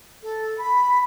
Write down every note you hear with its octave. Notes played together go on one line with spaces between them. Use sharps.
A4
B5